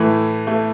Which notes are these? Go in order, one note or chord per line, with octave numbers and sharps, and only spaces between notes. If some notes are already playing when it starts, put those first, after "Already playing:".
Already playing: A2 E3 A3
A3